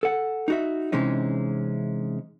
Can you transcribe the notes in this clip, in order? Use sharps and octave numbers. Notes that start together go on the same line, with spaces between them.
A4 F#5
D#4 F#4 E5
C3 E3 G#3 C#4 D#4